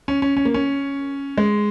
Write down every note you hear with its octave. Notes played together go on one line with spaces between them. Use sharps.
C#4
C#4
C#4
A#3
C#4
G#3